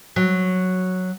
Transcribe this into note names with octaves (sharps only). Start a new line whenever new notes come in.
F#3